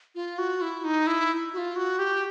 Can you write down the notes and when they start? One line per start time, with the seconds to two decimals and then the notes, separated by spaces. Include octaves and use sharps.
0.15 F4
0.38 F#4
0.61 E4
0.84 D#4
1.07 E4
1.53 F#4
1.58 F4
1.76 F#4
1.99 G4